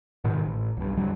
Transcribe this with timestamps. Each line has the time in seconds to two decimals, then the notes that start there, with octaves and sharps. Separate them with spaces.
0.24 G#2 B2 D#3
0.45 A1
0.77 B1 G2
0.97 F#2 D3 F#3 G3